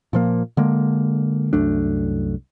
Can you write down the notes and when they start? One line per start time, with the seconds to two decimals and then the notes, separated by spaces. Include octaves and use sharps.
0.13 A#2 F3 A#3
0.57 D3 G#3 A#3
1.53 C2 F#2 A3 D4